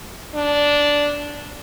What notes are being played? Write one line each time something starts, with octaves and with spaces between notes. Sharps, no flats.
D4